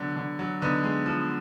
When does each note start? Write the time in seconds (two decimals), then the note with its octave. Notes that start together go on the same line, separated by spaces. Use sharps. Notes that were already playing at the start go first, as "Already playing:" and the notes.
Already playing: D3 F#3 B3
0.16 D3
0.39 F#3
0.61 D3 B3 D#4
0.84 G#3
1.06 F3